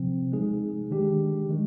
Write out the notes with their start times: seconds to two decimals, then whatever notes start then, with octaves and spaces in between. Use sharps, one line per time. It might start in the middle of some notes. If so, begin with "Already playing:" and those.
Already playing: C3 F3 C4
0.32 G#3 D#4 G#4
0.91 D#3 G#3 D4 G4
1.49 D#3 G#3